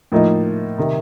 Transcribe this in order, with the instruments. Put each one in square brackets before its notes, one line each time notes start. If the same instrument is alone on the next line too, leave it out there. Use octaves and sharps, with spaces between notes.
[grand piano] A2 F3 A#3 D#4
C3 D#3